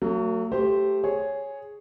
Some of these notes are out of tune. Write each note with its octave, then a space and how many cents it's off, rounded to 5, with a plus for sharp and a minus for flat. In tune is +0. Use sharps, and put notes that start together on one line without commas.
F#3 +0 A3 +45
A3 +0 G4 +5 C5 +0
G#4 +0 C#5 +0